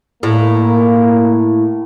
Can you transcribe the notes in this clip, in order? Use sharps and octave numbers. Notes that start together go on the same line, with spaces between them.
A2 A#3